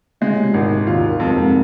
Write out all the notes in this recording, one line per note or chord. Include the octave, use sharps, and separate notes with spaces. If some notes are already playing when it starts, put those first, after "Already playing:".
C#3 G#3
C3
A#2
G#1 C3
D#2 D#3 F4
F2 G#3
A#3
G#2 G#3